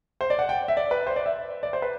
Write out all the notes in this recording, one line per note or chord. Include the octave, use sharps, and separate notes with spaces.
C5
D5
F#5
G5
E5
D5
B4
C5
D5
E5
D5
C5
B4